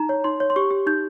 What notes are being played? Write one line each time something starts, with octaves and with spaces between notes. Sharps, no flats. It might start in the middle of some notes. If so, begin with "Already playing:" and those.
Already playing: D#4 A#5
C#5
D#4 C6
C#5
C6
G4 C#6
G4
D#4 G6